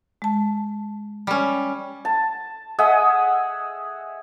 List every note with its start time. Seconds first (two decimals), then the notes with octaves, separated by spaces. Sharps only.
0.22 G#3 A5
1.27 G3 C#4
2.05 A5
2.79 G#4 D#5 E5 F#5